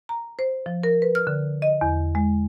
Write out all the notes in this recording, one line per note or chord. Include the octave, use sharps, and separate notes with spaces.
A#5
C5
F3
A#4
B4
F6
D3
D#5
E2
G#3